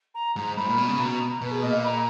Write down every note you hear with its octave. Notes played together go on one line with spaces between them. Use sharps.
A#5
G#2 A#5
G#2 B5
A#2
B2
C#3
B2 A#5
B2 B4
G#4
A#2 D#5
F5
B5
A#5